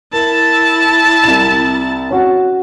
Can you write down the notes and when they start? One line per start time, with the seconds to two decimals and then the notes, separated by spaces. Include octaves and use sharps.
0.13 E4 A#4 A5
1.24 C2 E7
2.11 C#4 F#4 F#5